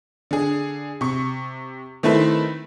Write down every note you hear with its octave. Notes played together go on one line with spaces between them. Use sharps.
D3 G#4
C3 C#6
D#3 A3 C4 E4 B4